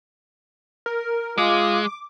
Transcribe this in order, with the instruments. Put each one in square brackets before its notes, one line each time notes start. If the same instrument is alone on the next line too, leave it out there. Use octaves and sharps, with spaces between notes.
[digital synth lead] A#4
[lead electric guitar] G#3 [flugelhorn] F4 [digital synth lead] D6